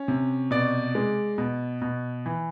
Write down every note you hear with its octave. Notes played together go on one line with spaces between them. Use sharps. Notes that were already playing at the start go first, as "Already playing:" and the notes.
Already playing: C#4
C3
B2 D5
G#3
B2
B2
E3